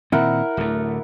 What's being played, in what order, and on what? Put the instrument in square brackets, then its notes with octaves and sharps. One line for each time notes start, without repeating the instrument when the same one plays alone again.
[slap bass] A#2 D#3 C4 [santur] E4 A#4 F#5
[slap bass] D1 D2 A3